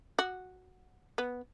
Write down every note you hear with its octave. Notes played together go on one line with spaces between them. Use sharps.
F#4
B3